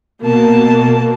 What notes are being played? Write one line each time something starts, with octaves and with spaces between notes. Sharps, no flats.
B2 A#3 A5